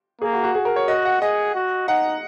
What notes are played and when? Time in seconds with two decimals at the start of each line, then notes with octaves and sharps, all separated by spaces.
0.21 A#3 G#4
0.33 F#4
0.44 F#4
0.55 G#4
0.65 A#4
0.76 C#5
0.88 F#4 D#5
1.05 F#5
1.22 G#4 D#5
1.55 F#4
1.88 D#4 F#5